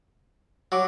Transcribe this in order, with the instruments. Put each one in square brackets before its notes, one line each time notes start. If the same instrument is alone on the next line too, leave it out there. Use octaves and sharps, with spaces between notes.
[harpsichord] F#3 [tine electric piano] F#5 C#6 D6